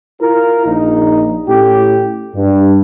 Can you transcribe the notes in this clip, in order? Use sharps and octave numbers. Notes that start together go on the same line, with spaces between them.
E4 F4 A#4
A#1 D#4
A2 C#4 E4 G4
G2